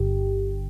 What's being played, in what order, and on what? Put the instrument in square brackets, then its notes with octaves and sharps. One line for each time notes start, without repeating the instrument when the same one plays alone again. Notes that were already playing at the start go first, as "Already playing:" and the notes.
Already playing: [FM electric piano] G1 G2 D3 G4